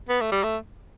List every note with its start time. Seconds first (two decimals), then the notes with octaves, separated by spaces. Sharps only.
0.09 B3
0.21 A3
0.32 G3
0.43 A3